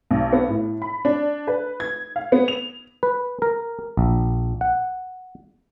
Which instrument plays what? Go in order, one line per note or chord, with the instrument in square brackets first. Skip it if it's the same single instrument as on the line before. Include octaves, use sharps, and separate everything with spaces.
[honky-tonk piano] B1
B3
A2
B5
D4
B4
G#6
F5
B3
F7
[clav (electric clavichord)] B4
A#4
A#1
F#5